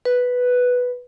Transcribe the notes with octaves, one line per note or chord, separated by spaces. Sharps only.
B4